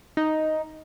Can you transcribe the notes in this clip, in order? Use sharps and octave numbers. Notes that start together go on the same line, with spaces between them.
D#4